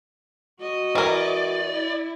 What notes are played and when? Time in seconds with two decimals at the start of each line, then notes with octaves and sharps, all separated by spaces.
0.60 F#4 D#5
0.95 E3 A#4 D5
1.73 E4